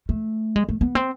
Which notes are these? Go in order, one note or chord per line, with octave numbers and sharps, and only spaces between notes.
A3
G#3
A3
B3
C4